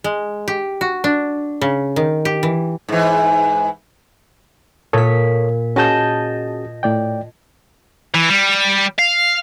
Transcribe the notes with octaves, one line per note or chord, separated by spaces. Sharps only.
G#3
G4
F#4
D4
C#3
D#3
G4
E3
G#2 E3
A#2 A4 C#5 D#6 B6
C#4 F#4 G#4 D#5 A5 G6
A2 D5 G5
E3
G3
F5